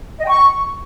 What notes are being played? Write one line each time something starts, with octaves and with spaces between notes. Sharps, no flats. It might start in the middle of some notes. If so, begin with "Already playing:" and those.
D#5
G5
C#6